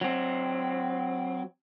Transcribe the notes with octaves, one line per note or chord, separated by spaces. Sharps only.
F#3 C4